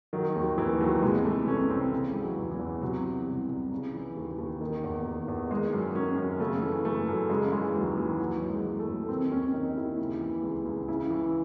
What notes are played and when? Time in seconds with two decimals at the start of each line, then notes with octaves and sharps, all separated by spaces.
0.13 D#3 F#3
0.35 D#2 F#3
0.58 D#3 E3
0.80 D#2 F#3
1.02 C3 G#3
1.25 E3 A3
1.48 C2 C#4
1.70 C2 C4
1.92 C#3
2.11 E3 G#3
2.22 F#3
2.37 E2
2.51 E3
2.59 E2
2.81 C3 F#3
3.04 E3
3.26 C2
3.48 C2
3.72 C#3
3.94 E3
4.17 D#2
4.38 D#2
4.61 D#3
4.84 E2
5.06 D#3
5.28 E2
5.50 D#3 G#3
5.73 F#2
5.95 D#3 C#4
6.17 F#2
6.40 C#3 A3
6.62 E3
6.85 F#2 A3
7.08 F#2
7.30 C#3 G#3
7.52 E3 G#3
7.75 D#2 F#3
7.97 D#2 E3
8.19 E3 F#3
8.42 F#2
8.50 G#3
8.64 E3
8.80 A3
8.87 F#2
9.08 D#3 C4
9.31 D#2 C#4
9.53 D#3 D#4
9.76 D#2 E4
9.98 C#3
10.21 E3
10.43 C#2
10.66 C#2
10.88 C#3 E4
11.10 E3